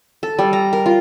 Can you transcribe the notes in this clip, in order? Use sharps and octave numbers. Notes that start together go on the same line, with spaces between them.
A4
G3
A#5
A#4
F4